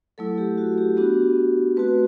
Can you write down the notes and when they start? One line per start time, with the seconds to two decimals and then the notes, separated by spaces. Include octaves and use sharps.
0.18 F#3 A3 E4 A4
0.38 G4
0.58 F#4
0.78 G4
0.97 B3 D4 F#4 G4
1.77 A3 C4 F#4 B4